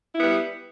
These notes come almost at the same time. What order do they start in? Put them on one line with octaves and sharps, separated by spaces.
E4 B3 G3